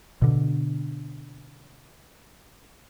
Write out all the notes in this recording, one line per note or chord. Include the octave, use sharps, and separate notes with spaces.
B2 D3